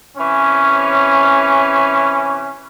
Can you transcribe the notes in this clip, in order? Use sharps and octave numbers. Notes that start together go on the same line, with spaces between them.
C3 E3 C#4